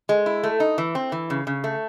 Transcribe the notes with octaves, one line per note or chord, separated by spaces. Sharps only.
G#3
E4
A3
D#4
E3
C4
E3
C#3
C#3
A3